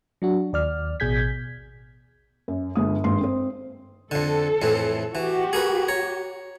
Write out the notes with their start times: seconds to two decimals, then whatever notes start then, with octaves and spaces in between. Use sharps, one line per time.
0.22 F#3 D4 F#4
0.53 D#2 D5 F6
1.00 A1 B2 G#4 G6 G#6 B6
2.48 F#2
2.75 G1 G#3 D#6
3.04 G#1 G2 G#3 C6
3.21 C4 C5
4.11 F2 D3 A4
4.62 F2 A2 E3
5.15 E3 F#4 G4
5.53 G#4 A#4 B4
5.88 C#5 A#5